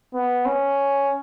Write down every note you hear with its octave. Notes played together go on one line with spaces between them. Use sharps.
B3
C#4